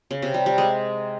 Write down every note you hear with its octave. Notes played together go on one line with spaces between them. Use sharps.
C#3
C3
G3
G3
G#3